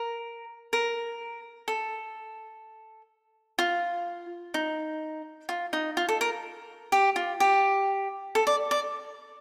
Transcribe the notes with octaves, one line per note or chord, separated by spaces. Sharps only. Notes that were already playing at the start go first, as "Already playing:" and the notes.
Already playing: A#4
A#4
A4
F4
D#4
F4
D#4
F4
A4
A#4
G4
F4
G4
A4
D5
D5